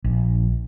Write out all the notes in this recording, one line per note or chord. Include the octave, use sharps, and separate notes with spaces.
A#1